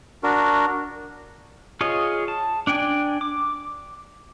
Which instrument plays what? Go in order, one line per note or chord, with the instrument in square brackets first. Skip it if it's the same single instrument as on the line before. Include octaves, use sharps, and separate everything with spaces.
[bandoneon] D4 F#4 A#4
[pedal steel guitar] F4 G#4 C#5 D#5
A5
D4 D5 G5 G#5
D6